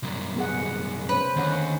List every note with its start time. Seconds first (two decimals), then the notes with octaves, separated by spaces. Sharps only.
0.03 C2 F#2
0.36 B3 G#4 F#5
1.09 C#4 B4 C5
1.36 D#2 D3 C#4 F#5